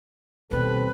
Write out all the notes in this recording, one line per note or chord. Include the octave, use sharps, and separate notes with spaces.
D#2 B2 G3 C4 A4 B4